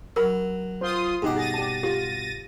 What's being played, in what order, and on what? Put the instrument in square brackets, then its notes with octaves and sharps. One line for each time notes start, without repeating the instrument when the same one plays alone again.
[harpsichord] F#3 [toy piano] A#4 B5
[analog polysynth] F4 C6 D#6 [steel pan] C5
[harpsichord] G2 B2 F#5 [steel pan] D#4 G4 G#4
[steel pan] G#4 [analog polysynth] A6 A#6 D#7
[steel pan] G4 A5
[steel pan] F4 [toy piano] G4